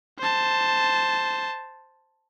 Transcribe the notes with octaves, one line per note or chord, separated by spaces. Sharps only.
C5 A5